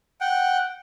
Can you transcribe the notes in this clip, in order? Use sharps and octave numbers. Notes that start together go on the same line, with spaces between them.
F#5 G5